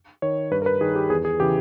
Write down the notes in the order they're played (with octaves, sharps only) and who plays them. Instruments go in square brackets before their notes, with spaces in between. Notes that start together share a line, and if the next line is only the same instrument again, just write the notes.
[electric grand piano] D#3 C#5
G2 B4
A#4
B4
D#3 G#4
G4
E2 G#4
G#4
C#3 E3 G4